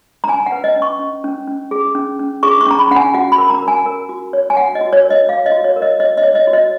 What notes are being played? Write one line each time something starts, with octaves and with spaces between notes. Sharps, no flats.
A#5
C#4 G#5
F#5
B4
D#5
C#4
C#6
C#4
C#4
C#4
G#4
C#4
C#4
G#4 C#6
C#6
C#4 A#5
B5
C#4 F#5
G#5
F#4 F#5
B5
A#4
A#5
A#4
G#5
A#4
F#4
C#5
G#5
F#4 F#5
D#5
F#4
C#5
A#4
D#5
C#5 F5
D#5
F#4
C#5
A#4
D#5
C#5 D#5
D#5
C#5
D#5
F#4
D#5